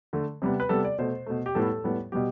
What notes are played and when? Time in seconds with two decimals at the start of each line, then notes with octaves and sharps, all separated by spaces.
0.13 D3 A3
0.42 C3 G3 B3
0.60 B4
0.69 C3 G3 B3 A4
0.84 D5
0.98 B2 A3 C5
1.26 B2 A3
1.46 G4
1.55 A2 G3 B3 A4
1.84 A2 G3 B3
2.12 B2 G3 B3 G4